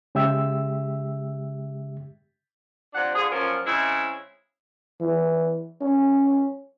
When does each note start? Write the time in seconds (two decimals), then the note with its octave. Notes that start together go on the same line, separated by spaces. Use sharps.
0.15 C#3 G#3 G4 E5 E6
2.94 C3 F3 D4 F#5
3.15 D3 F4 G#4
3.32 F#2 A#2 F3 C#4 A#4
3.65 C#3 G#3 C4 E4
5.01 E3
5.81 C#4